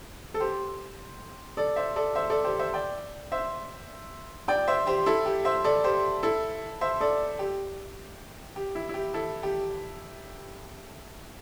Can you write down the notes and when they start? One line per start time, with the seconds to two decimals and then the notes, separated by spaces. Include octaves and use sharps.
0.34 A4
0.40 G4 C5
1.57 A4 D5
1.76 C5 E5
1.96 A4 D5
2.15 C5 E5
2.30 A4 D5
2.44 G4 C5
2.59 C5 E5
2.74 D5 G5
3.32 C5 E5
4.48 D5 G5
4.67 C5 E5
4.87 G4 C5
5.06 E4 A4
5.26 G4
5.45 C5 E5
5.64 A4 D5
5.84 G4 C5
6.23 E4 A4
6.81 C5 E5
7.00 A4 D5
7.39 G4
8.56 G4
8.75 E4
8.89 E4
8.94 G4
9.14 E4 A4
9.43 G4